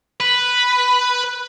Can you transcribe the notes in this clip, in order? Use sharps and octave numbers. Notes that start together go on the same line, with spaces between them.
B4